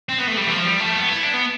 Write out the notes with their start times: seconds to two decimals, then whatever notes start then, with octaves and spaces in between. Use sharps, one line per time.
0.09 C4
0.18 B3
0.27 A3
0.37 G3
0.47 E3
0.51 F3
0.65 G3
0.80 A3
0.94 B3
1.09 E4
1.23 D4
1.33 B3